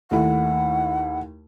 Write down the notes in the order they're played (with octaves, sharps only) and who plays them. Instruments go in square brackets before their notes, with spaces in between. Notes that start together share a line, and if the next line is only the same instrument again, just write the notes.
[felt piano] D#2 A3 E4 [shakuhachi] F#5